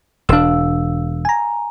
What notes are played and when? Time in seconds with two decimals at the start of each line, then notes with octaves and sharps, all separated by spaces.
0.29 E1 D4 F5 E6
1.25 G#5 A#5